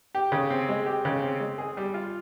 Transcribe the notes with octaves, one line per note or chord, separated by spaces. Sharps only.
G4
C#3
C4
G#3
G4
C#3
C4
G#3
G#4
G3
F4